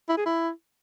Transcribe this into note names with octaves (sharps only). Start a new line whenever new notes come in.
E4
G#4
E4